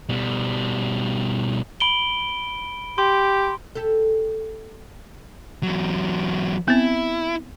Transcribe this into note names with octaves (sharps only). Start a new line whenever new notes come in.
B2 G3
B5 D7 G7
G4 C6
G4 A4
E2 F#3
B3 C4 E4